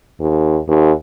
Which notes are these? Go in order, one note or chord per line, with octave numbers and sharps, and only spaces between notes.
D#2
D#2